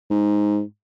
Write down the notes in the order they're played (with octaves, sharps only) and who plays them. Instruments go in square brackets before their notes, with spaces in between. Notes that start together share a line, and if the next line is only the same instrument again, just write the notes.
[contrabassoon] G#2